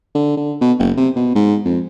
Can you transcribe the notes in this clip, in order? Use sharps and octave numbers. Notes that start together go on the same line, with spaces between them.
D3
D3
B2
F#1
C3
B2
G#2
F2